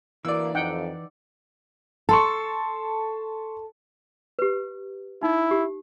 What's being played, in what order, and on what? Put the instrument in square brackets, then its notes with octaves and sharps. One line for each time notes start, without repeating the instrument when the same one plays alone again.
[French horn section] D2 A#3 [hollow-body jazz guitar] E3 [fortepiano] D5 E6
[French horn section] F2 [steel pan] D#4 F#5 G5
[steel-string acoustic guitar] A4 [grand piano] A5 C6 C#6
[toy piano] G4 B4
[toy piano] D#4 [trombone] E4
[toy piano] G4